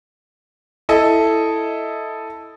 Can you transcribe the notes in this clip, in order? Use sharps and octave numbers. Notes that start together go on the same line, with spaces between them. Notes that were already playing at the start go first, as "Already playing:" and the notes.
E4 A4 D#5